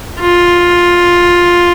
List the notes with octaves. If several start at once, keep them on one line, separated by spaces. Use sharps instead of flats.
F4